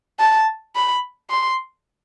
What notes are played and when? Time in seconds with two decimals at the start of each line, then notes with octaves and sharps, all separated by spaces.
0.19 A5
0.75 B5
1.30 C6